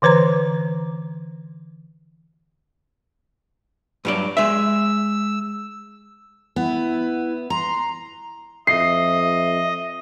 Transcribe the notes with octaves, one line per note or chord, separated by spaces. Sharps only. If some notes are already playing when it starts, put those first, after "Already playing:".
D3 E3 B4 C5 A#5
G2 F#3 D5
G#3 E5 E6
B3 E4
A#5 C6
F2 D#5 E5 C7